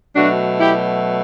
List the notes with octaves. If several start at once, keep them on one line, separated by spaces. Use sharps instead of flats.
B2 F#3 A3 D4 F#4
E4 G4